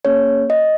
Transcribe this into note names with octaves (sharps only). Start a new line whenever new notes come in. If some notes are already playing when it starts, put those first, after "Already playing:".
A#3 C#4 G#4 C#5
D#5